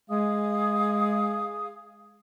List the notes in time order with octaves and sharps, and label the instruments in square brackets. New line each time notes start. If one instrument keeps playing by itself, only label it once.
[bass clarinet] G#3 [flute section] G#4 F5 D#6